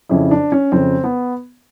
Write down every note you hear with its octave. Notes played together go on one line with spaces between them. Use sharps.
F2 C#3 F3 E4
D4
C#4
F2 C#3 F3 C4
B3